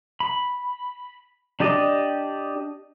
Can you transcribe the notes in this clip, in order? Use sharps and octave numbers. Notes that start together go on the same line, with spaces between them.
B5
D4 G4 D5 D#5